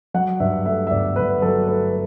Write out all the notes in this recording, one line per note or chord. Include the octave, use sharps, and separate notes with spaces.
F#3 F#5
G2 E5
A3 E5
E5
G1 D5
G2 B4
F#3 A4
A3 B4